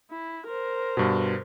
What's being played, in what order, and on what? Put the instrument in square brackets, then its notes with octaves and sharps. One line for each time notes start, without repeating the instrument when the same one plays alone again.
[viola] E4
A#4 C5
[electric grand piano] G2 B2